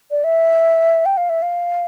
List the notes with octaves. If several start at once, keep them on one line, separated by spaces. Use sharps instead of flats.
D5
E5
G5
F5
E5
F5